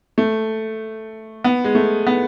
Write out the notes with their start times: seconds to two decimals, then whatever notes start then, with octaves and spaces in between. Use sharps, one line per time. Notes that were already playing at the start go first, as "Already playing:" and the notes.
0.18 A3
1.44 B3
1.64 G#3
1.75 A3
2.07 B3